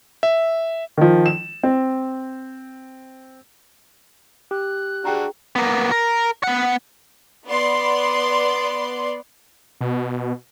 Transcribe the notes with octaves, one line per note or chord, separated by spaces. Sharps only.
E5
D#3 F3
E7
C4
G4 F#6
D4 F#4 G#4 G5 A#5
A#3 B3
A#4
B3 F#5
B3 D5 C6
B2